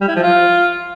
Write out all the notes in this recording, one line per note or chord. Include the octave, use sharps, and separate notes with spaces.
G3
E4
F3
F4